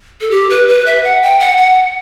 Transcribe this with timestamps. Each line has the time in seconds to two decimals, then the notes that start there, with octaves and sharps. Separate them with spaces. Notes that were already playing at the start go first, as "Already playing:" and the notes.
0.21 A4
0.31 G4
0.50 B4
0.68 B4
0.86 E5
1.04 F#5
1.22 G5
1.40 F#5
1.58 F#5